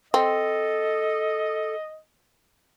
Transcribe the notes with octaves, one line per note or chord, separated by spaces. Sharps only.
C4 A4 D#5